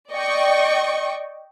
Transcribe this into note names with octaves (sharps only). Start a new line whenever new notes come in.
D5 D#5 G5 C#6